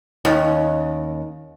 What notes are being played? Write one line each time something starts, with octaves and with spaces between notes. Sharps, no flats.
D#2 C#4